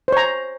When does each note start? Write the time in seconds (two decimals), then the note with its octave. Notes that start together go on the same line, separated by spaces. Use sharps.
0.08 C5
0.12 C#5
0.17 A#5